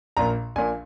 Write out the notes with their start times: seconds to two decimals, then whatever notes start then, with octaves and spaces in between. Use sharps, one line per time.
0.17 A#1 A#2 A#3 A#5
0.56 A#1 A#2 A#3 G#5